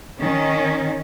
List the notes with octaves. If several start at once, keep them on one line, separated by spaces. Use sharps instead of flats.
D#3 C#4